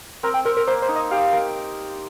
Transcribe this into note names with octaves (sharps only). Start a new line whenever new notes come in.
C4 A#4
G5
C4 A#4
A#4
A#3 C5
C5
D#4
D#5
G4 F5
A#4